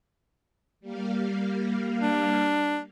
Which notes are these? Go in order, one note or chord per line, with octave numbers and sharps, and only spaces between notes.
G3 A#3 F5
D4